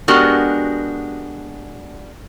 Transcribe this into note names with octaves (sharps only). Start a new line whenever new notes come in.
G#3 B3 D4 F#4 G4 A#4